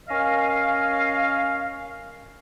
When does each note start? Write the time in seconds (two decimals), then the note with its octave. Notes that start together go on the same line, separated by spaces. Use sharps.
0.09 C#4 A#4 D#5 F5